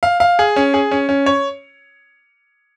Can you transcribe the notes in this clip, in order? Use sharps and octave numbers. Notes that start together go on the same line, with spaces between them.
F5
F5
G#4
C#4
G#4
C#4
C#4
C#5